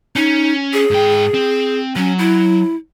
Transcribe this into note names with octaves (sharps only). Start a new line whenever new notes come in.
C#4 D#4
G#4
G#2 G5
C4
F#3 C#4
E4